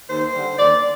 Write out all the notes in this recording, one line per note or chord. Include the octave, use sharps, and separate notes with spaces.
D#2 C5
D3 G3
D#2 D5